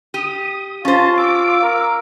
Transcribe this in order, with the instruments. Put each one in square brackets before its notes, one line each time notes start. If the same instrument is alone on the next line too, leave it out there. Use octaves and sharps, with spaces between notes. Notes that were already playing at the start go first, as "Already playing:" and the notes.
[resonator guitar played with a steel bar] G4 [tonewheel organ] D#6
[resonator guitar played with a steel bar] C#4 C5 [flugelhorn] F4 [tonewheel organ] A5
[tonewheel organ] D6 [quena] E6
[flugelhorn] A#4